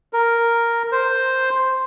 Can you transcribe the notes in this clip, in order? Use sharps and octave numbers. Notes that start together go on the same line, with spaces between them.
A#4
C5